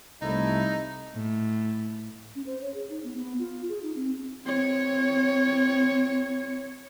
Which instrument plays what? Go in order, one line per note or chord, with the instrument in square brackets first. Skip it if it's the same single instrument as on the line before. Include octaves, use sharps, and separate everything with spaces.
[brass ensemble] C2 A3 E4 [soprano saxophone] D#4
[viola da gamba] A2
[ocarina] C#4
C5
C#5
G#4
D#4
B3
B3
F4
G#4
D#4
C4
[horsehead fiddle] C4 C#5